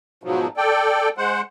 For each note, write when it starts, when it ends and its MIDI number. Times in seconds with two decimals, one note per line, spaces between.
0.24 0.47 44
0.24 0.47 47
0.24 0.47 53
0.24 0.47 54
0.57 1.09 69
0.57 1.09 74
0.57 1.09 79
1.17 1.41 56
1.17 1.41 72
1.17 1.41 78